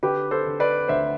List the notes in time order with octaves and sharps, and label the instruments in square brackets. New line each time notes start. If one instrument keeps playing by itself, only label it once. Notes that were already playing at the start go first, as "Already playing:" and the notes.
[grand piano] D3 G4 B4
A4 C5
D3
B4 D5
D2 C5 E5